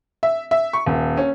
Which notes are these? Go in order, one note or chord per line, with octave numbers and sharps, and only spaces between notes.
E5
E5
C#6
D#1
C#4